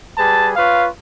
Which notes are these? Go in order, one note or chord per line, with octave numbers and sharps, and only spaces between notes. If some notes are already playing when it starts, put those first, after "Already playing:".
G3 G#4 B4 A5
F4 B4 C#5 F5